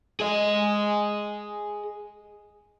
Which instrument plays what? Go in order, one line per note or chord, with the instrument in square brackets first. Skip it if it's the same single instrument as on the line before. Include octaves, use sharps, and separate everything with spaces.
[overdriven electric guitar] G#4 D#5